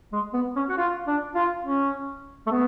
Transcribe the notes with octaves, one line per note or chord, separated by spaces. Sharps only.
G#3
B3
C#4
F#4
F4
D4
F4
C#4
A3
B3